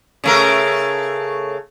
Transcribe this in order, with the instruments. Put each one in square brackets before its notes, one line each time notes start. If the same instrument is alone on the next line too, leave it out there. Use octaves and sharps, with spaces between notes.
[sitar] C#3 A3 A#4